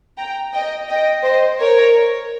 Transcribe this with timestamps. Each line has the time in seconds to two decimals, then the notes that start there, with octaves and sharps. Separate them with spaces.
0.18 G5 A#5
0.54 D#5 G5
0.89 D#5 G5
1.25 C5 D#5
1.60 A#4 C#5